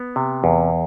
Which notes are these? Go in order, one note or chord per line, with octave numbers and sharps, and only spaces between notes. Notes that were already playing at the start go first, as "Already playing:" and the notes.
Already playing: B3
C3
E2